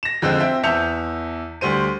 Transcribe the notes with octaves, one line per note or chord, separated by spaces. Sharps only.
A#6 E7
F2 D3 G#3 C4
C4 E5 G5
E2 E5 A5 G6 C#7 F7
D2 G3 C5 D#7